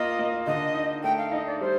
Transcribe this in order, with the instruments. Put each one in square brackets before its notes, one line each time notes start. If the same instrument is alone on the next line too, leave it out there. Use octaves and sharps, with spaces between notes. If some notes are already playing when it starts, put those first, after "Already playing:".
Already playing: [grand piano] A#3 F4 [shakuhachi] D#5
[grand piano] A#3
[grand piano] D3 [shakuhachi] D#5
[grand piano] D#4
[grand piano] A3 [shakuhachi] G5
[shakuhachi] F5
[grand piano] D#4 [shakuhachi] D#5
[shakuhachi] D5
[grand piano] G3 [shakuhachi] C5